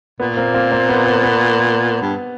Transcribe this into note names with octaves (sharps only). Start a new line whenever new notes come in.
A#2 B3
A#3 C4
A#3 C4
A#3 C4
B3
B3
B3
G2